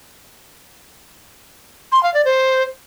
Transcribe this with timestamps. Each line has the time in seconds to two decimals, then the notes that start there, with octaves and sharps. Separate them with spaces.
1.92 C6
2.03 F5
2.14 D5
2.25 C5